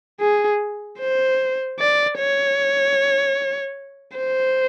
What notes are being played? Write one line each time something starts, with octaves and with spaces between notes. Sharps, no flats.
G#4
C5
D5
C#5
C5